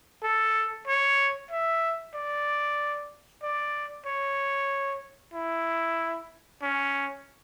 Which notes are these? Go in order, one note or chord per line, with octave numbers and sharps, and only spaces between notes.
A4
C#5
E5
D5
D5
C#5
E4
C#4